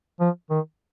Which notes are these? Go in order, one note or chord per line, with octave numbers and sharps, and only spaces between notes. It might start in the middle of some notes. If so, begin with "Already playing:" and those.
F3
D#3